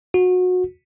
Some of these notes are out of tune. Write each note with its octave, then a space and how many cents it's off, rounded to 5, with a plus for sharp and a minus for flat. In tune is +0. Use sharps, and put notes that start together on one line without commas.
F#4 -25